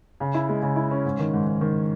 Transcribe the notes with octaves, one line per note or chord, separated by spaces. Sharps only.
C#3
E4
G#3
C#3
E4
C#4
G#2
D#3
G#2
G#2
D#3